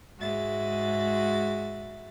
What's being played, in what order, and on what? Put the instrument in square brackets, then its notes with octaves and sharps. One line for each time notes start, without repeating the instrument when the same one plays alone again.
[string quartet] G#2 G#3 F#4 E5 A6